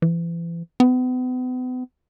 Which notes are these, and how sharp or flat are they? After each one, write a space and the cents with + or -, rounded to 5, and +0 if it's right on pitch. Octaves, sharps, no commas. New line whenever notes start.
E3 +35
B3 +40